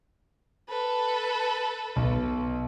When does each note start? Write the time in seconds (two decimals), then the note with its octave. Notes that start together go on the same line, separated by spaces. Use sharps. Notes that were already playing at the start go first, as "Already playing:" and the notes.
0.68 A4 B4
1.96 B1